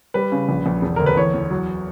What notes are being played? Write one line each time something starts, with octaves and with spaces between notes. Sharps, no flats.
G3 B4
C#3
A#1
A#1
E1
D2 A#4
B4
E2 C#5
E2
F#3